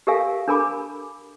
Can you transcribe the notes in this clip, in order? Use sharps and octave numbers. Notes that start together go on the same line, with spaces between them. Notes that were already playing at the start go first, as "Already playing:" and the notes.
G4 A4 A#4 E5 F5 G#5
D4 A4 A#4 G#5 B5 D6